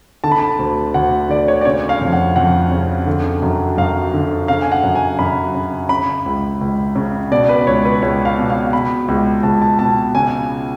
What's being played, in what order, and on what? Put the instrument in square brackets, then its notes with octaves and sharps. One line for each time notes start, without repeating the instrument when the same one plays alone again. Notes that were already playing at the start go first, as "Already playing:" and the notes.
[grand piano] D3 A5
B5
A5
D2
D2 F#5
D3 D5
C#5
D5
C#3 C#5
F5
F2
F#5
F2 F#5
C#3
D3
F#2
F#2 F5
D3
C#3 F5
G#5
F#5
F#2
G#5
F#2 B5
C#3
C#3 B5
C#2
C#2
C#3
B2 D5
B4
C#2 C#5
B4
C#2 C#5
F5
B2
F5
B2 B5
C#2
C#2 A5
A5
B2 A5
C#3 G#5